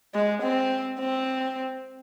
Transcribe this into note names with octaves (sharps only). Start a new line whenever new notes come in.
G#3
C4
C4